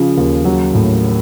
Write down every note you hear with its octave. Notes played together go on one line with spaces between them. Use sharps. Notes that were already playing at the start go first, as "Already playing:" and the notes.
Already playing: C#3 F3
D#2
F#3
A2